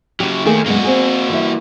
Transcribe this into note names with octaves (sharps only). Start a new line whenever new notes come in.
C#3 F#3 G4
D#2 D#3 A3 A#3 G#4
F#2 B2 G#3 A#3 F#4
C4 G#4
E3 G3 E5